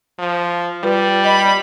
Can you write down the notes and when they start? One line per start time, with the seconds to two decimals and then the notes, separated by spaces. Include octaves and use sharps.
0.19 F3
0.83 G3 F4 B4
1.25 D#5 B5